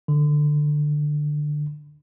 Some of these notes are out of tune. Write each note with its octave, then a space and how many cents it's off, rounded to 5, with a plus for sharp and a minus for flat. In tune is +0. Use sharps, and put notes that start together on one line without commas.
D3 +15